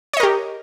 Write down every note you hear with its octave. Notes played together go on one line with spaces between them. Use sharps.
G4 A#4 C#5 D#5